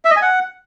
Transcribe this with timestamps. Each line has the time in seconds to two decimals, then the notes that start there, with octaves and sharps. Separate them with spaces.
0.05 E5
0.11 D#5
0.16 G#5
0.22 F#5